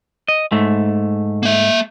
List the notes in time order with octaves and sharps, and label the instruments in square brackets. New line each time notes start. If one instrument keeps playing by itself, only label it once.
[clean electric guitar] D#5
G#2 A3
[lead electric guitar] A#3 E5